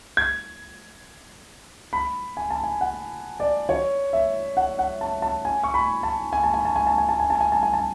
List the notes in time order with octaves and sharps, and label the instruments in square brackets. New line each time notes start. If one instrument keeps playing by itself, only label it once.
[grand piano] G#6
B5
G#5
A5
G#5
F#5
D5
C#5
E5
F#5
F#5
A5
A5
G#5
C#6
B5
A5
G#5
A5
G#5
A5
G#5
A5
G#5
A5
G#5
A5
G#5
A5
G#5
A5